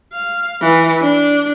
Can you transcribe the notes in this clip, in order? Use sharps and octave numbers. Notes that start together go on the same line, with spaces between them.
F5
E3
D4